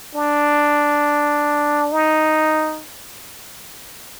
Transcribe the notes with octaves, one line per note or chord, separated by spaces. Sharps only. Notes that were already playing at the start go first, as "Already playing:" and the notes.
D4
D#4